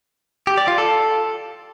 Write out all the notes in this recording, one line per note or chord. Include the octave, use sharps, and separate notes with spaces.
G4
D5
F4
A4